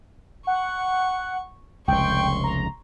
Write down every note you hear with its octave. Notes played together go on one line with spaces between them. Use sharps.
F#5 C#6
F1 C#2 G5 C6 C#6
A#5